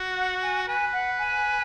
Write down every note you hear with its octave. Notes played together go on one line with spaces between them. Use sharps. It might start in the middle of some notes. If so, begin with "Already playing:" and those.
Already playing: F#4
F#5
G#5
B4 G#5
F#5
G#5